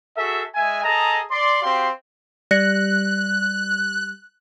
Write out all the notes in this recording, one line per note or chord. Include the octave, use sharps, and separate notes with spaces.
F#4 G#4 A4 E5
G#3 E5 G#5
G#4 A4 D#5 A5 A#5
D5 C6
C4 F#4 G4 F5 C6
G3 D5 F#6 A#6 C#7